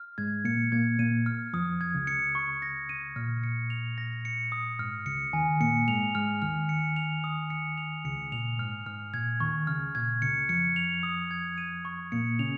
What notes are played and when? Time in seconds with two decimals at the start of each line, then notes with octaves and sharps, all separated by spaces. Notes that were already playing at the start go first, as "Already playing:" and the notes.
Already playing: F6
0.18 G#2 G#3 G#6
0.45 A#2 A#3 C#7
0.72 A#2 A#3 G#6
0.99 A#2 A#3 D#7
1.26 F6
1.53 F2 F3 D#6
1.81 G#6
1.94 C#2 C#3
2.07 C#7
2.35 C#6
2.62 A#6
2.89 D#7
3.16 A#2 F6
3.43 C#7
3.70 F7
3.98 A#6
4.25 C#7
4.52 D#6
4.79 G#2 F6
5.06 C#2 C#3 C#7
5.33 D#2 D#3 G#5
5.60 A#2 A#3 C#7
5.87 G#2 G#3 F7
6.15 G#2 G#3 F6
6.42 D#2 D#3 F6
6.69 C#7
6.96 F7
7.24 D#6
7.50 C#7
7.78 F7
8.05 C#2 C#3 C#7
8.32 A#2 F7
8.59 G#2 F6
8.86 G#2 F6
9.13 A#2 G#6
9.40 D#2 D#3 C#6
9.67 C#2 C#3 F6
9.95 A#2 G#6
10.22 C#2 C#3 C#7
10.49 F2 F3 C#7
10.76 F7
11.03 D#6
11.31 G#6
11.58 D#7
11.85 C#6
12.12 A#2 A#3 C#7
12.39 C#3 C#4 F7